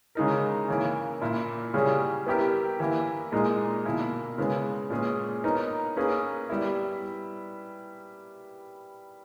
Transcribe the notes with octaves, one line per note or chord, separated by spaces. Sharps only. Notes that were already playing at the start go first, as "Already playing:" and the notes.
C#3 G#3 D#4 A#4
C#3 E3 A#3
A#2 A#3 E4
C#3 G3 C#4 G#4
B3 E4 G4 A#4
E3 A#3 E4
A#2 G#3 D#4 A#4 D#5
B2 A#3 E4
C#3 G#3 B3
A#2 G#3 C#4 G#4
B3 D#4 A#4 C#5
A#3 C#4 G#4 B4
G3 B3 E4